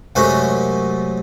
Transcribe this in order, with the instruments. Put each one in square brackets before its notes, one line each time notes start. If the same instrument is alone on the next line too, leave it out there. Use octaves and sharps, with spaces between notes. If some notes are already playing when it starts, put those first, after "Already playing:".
[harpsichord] F#2 C3 G#3 A3 F#4